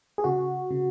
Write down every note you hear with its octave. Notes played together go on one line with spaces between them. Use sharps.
G#4
C#3 F#4
C#3